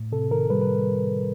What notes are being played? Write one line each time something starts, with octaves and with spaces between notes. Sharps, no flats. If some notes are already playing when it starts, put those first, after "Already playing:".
Already playing: A2
C3 A4
D#3 A#4
G3 B4
B4